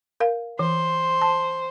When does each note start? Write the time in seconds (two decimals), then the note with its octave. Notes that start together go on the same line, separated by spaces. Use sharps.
0.20 A#4 F5
0.59 E3 C5
1.21 A5